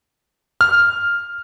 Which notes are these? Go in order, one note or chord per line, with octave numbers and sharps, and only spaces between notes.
F6